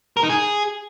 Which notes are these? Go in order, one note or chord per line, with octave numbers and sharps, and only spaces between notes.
A#4
D#4
G#4